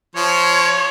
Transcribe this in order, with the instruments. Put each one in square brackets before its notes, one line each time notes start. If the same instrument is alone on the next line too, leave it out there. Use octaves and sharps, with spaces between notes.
[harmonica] F3 [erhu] C#5